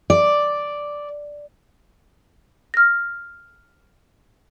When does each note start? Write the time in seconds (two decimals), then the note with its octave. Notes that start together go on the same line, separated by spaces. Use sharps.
0.10 D5
2.74 F6 A#6